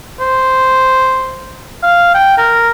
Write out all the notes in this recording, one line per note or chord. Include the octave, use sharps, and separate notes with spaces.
C5
F5
G5
A#4